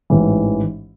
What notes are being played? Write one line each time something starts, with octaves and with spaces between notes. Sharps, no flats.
A1 G#2 E3